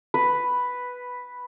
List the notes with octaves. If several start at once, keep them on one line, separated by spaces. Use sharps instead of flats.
B4